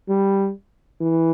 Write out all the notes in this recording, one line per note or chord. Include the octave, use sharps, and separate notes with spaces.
G3
E3